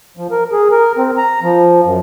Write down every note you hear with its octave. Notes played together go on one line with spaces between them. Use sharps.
F3
A#4
G#4
A#4
C4
A#5
F3
F#2